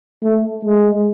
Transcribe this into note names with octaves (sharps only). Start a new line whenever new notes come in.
A3
G#3